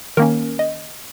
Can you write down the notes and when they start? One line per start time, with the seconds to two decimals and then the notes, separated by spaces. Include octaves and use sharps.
0.17 D#3 A#3 C#4 A#4
0.59 D#5